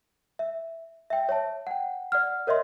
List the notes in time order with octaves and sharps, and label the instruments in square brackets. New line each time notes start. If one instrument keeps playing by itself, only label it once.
[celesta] E5
E5 G5
C#5 E5 A5
F#5 G5
D5 F#5 F6
A#4 C#5 D#5 E5 C6